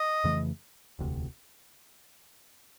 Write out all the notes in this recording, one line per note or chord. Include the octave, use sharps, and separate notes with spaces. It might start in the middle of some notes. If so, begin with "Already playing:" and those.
Already playing: D#5
F2 C#3 E3 A3
E1 D2 C3